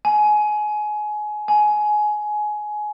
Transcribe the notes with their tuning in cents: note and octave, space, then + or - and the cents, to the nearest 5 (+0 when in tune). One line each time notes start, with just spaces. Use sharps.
G#5 +25
G#5 +20